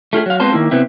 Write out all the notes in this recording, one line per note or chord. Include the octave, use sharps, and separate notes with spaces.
A3 F4 G4 G#4
F#3 F5
G#3 B3 C4 F4 C5 A5
D#3 A#3 E4
C3 B3 C4 E4